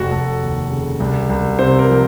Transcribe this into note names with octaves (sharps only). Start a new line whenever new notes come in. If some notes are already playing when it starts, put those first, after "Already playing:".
Already playing: F1 F#4
F1 A4
D#2
C#3
C2
C2
C3 C5
A#4
F3